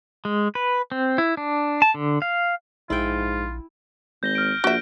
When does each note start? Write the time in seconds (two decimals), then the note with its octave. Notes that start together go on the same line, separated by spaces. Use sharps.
0.25 G#3
0.55 B4
0.92 C4
1.18 E4
1.37 D4
1.82 A5
1.94 D3
2.22 F5
2.90 A#1 G#2 E4 F4 G5
4.23 G#1 G6 A#6 G7
4.35 F6 D7
4.64 A#1 F#4 E5 A#6 D7 G7